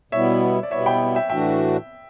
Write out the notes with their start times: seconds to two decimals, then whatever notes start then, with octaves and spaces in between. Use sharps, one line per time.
0.12 B2 G3 B3 E4 C#5 E5
0.63 D5
0.71 B2 G3 B3 E4 C#5 E5
0.86 G5 B5
1.15 E5 G5
1.30 A2 E3 A3 D4 F#4 E5 G5